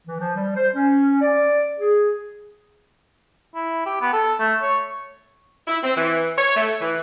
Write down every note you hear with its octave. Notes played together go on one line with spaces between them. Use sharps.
E3
F3
G3
C5
C#4
D5
G#4
E4
G4
B3
A4
A3
C#5
E4
C4
E3
C#5
A3
E3